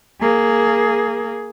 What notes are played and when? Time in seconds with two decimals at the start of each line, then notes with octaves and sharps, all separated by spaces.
0.22 A#3 G#4